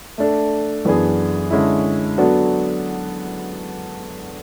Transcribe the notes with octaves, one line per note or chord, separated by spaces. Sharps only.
A3 D4 A4
F#2 E3 B3 D4 G#4
D3 G#3 C#4 E4
F#3 B3 D4 F#4 A4